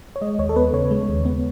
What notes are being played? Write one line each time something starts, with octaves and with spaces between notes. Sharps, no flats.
C#5
G#3 D#5
D#2 C#5
A4
B3 B4
C#3 C#5
G#3
D#2
B3